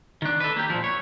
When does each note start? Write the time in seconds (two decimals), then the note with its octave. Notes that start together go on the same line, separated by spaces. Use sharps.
0.22 D#3 D4
0.40 A4 B4
0.56 A#3 G4
0.70 A#2 F3
0.84 C#5